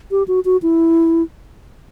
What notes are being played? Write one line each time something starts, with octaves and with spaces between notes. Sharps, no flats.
G4
F#4
F#4
E4